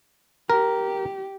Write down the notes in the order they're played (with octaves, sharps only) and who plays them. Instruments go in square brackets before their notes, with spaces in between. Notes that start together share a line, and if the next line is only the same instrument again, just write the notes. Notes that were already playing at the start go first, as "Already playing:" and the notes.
[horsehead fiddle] G4 [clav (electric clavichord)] A#4